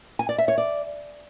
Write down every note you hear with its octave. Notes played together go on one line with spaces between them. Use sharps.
G#5
D5
E5
C#5
D5